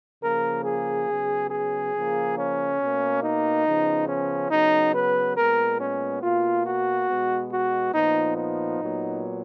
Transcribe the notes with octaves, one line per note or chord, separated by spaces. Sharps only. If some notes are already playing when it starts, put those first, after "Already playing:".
C#3 F3 A#3 A#4
G#4
C#3 F#3 B3
G#4
C#3 F3 A#3
C#4
B2 A#3
D#4
C#3 F3 B3
C#4
C#3 F#3 B3 D#4
B4
A#2 G#3 B3 A#4
C#4
B2 A#3 F4
F#4
B2 G#3 B3
F#4
A#2 F3 B3 D#4
D#4
A#2 F#3 B3